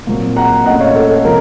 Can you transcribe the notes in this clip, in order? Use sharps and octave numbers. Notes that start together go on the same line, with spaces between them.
A#2 F#3 C4
F#5 A#5
A#2 A3 C#4 D#5 F#5
C#5 F5
A4
A4
C3 F3 A#4